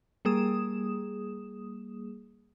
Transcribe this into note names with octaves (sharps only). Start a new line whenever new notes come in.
G3 A#3 G#4 D#6 E7